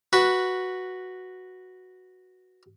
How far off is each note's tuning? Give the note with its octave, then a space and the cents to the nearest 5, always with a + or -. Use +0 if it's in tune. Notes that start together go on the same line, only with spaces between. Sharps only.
F#4 +0 B4 -10